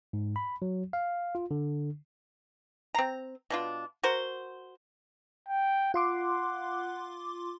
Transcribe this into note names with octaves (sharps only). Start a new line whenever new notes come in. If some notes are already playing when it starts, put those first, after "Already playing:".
G#2
B5
F#3
F5
F4
D3
C4 A#5
B2 D4 F4
F#4 A#4 C5
G5
F4 F#5 C6 D6